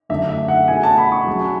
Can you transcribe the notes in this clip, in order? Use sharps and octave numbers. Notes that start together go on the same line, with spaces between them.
F#2 D3 A3 E5
E5
F#5
B2 A3 E4 G#4 G#5
A5
B5
C#6
F#3 C#4 G#4